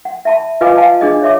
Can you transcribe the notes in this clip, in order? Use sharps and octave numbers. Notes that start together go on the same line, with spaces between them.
F#5
E5 A5 B5
F4 B4 D#5 F5 G#5 D6
F5 G#5 A5
D4 G#4 D#5
C#5 E5 D6